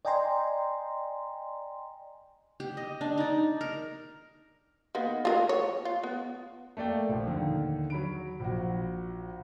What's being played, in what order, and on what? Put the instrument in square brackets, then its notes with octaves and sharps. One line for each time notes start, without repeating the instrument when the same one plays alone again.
[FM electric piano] D5 D#5 G5 G#5 A#5 C6
[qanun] G4
D#5
D4
D#4 D5
A#4
[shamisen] D#3 A#3 B3
F4 G#4 A#4
C#5
F4
B3
[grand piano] A3 A#3 D5 G5
A#1 F3
D#2 D3 D#3
F#3 B5 D7
A#1 F#4